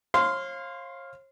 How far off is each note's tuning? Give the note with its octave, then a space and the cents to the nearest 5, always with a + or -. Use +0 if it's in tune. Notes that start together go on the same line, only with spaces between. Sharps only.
C#5 -45 F5 +0 C6 -20